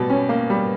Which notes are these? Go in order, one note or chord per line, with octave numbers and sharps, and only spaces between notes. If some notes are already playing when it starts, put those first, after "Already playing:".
Already playing: B2 G3
C#4
A#3
G3